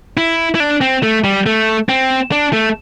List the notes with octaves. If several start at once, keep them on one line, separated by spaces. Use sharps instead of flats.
E4
E4
D4
C4
A3
G3
A3
C4
D4
A3